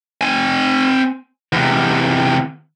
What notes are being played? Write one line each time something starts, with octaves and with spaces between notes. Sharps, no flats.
C4 G#5
E2 C3